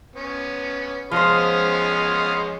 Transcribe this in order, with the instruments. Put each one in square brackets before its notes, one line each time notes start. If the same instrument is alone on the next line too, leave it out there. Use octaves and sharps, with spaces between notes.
[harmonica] B3 C#4
[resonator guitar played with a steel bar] F3 C5 [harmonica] G#3 C#4 C6 [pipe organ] B3 D#5 F5